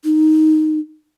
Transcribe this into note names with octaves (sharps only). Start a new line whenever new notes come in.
D#4